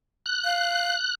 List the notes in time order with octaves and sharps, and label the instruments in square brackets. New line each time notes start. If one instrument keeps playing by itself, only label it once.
[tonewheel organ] F#6
[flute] F5